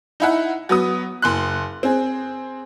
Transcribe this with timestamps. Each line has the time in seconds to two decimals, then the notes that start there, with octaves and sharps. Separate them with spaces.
0.20 D#4 E4 F#5
0.69 F#3 B3 D#6
1.22 F#1 C6 F#6
1.83 C4 G#4